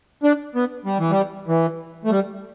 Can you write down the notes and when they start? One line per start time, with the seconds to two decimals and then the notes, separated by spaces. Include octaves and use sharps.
0.23 D4
0.55 B3
0.85 G3
0.99 E3
1.11 G3
1.48 E3
2.05 A3
2.11 G3